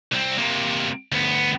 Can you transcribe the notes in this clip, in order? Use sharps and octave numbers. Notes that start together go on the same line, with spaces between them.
C2 C4
C3 A#3
D2 B3